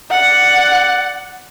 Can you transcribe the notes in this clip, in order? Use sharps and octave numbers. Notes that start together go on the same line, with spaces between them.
D5 F#5